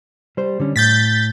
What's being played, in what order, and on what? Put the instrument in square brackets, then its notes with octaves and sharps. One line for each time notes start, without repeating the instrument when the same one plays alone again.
[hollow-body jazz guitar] G3 C5
D3 G3 C#4
[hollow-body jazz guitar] A2 [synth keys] G6 A6 B6